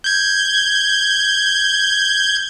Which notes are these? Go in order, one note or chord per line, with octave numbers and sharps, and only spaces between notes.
G6 G#6